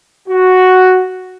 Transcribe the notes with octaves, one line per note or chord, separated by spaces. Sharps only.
F#4